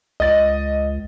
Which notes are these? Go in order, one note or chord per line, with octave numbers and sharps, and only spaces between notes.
C#2 D#5 A6